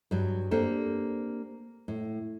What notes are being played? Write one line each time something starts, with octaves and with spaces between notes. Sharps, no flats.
G2 F#3
A#3 C4 D4 G4 A4
A2